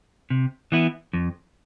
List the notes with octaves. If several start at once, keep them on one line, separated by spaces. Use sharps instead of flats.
C3
E3 B3 E4
F2